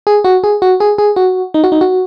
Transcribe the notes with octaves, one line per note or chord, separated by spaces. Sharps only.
G#4
F#4
G#4
F#4
G#4
G#4
F#4
D#4
F#4
D#4
F#4